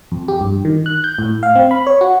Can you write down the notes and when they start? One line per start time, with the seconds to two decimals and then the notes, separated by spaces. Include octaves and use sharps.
0.12 F2
0.28 G4
0.41 G2
0.65 D#3
0.86 F#6
1.04 G6
1.18 A2
1.43 F5
1.55 C4
1.71 B5
1.87 C#5
2.01 F#4